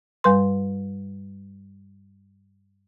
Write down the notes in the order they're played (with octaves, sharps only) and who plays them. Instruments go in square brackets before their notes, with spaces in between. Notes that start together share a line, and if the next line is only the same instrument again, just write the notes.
[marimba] G2 G3 B4 C6